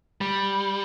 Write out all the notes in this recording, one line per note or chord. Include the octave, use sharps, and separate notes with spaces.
G3